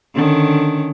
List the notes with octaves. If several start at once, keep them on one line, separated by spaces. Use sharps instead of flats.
D3 D#3 C#4